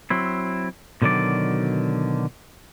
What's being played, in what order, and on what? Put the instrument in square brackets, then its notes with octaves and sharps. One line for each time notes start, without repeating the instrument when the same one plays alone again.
[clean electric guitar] F#3 C4 E4
B2 D3 D#3 F#3 D5